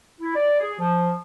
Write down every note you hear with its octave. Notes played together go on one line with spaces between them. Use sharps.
E4
D5
G#4
F3